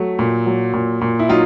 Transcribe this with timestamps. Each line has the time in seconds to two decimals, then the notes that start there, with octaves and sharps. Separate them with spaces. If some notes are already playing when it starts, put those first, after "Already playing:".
Already playing: F#3 A3
0.19 A#2
0.46 F#3
0.73 A#2
1.01 A#2
1.19 E4
1.29 F#3 D#4 F4